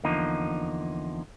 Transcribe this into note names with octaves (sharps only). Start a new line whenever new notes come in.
E2 D3 F3 A#3 D#4